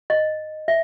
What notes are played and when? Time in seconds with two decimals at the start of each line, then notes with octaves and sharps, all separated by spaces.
0.10 D#5
0.68 E5